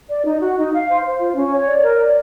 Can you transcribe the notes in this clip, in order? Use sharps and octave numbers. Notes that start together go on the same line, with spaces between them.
D5
D#4
F#4
D#4
F5
C5
C5
F4
C#4
C#5
D5
A#4
D5